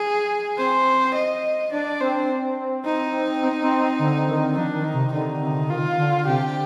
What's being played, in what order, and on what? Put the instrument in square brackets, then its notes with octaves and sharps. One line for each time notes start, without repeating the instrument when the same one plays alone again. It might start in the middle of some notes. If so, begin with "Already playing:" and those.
Already playing: [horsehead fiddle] G#4
[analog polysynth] C4 [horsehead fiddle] C5
[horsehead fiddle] D#5
[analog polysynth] D4 [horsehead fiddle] D5
[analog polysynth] C4 [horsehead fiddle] C5
[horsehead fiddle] D#4
[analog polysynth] C4
C4
C4
D3
D#3
[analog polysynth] F3 [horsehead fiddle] D4
[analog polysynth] D#3
[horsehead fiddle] D#4
[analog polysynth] C3
[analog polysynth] D3 [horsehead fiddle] D#4
[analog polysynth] C3
[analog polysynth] D#3 [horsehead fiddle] F4
[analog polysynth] D3
[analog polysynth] C3 [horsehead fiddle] G4